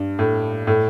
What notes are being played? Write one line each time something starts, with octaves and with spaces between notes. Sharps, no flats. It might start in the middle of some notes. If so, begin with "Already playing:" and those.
Already playing: G2
A2
A2